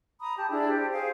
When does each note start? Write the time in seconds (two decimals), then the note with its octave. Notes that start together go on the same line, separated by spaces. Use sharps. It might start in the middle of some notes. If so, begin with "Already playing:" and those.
0.20 A#5 B5 D#6
0.37 G4 A5
0.50 D4 E4 G#4 D5
0.68 G4 C5
0.93 G#4 C5 F5